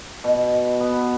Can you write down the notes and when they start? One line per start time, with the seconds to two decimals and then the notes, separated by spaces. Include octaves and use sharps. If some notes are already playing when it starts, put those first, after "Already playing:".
0.24 B2
0.80 B3